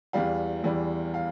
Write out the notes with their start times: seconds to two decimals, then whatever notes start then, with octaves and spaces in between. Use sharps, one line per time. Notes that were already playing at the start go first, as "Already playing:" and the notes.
0.13 E2 E3 G3 F5
0.64 E2 E3 G3
1.14 F5